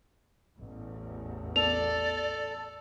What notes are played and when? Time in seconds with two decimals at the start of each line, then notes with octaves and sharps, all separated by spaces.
0.58 A1 E2
1.56 A4 D5 F7